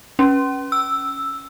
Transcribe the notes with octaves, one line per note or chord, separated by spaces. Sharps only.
C#4
E6